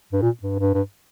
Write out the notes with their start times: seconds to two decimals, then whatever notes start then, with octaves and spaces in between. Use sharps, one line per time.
0.12 G2
0.22 A#2
0.43 G2
0.59 G2
0.74 G2